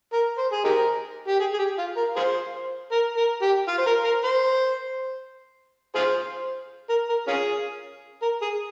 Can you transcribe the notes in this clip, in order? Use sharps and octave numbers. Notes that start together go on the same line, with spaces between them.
A#4
C5
G#4
D#4 G4 A#4
G4
G#4
G#4
G4
F4
A#4
F4 G#4 C5
A#4
A#4
G4
F4
C5
A#4
A#4
C5
F4 G#4 C5
A#4
A#4
C#4 F4 G#4
A#4
G#4